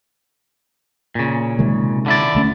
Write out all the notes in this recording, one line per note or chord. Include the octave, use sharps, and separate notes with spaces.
A#2 C#3
C3 D#3 G#3
D3 E4 D5
D2 A3 C#4